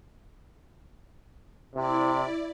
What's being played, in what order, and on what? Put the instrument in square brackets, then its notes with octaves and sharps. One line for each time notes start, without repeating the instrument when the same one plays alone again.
[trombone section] C3 [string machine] E4 D5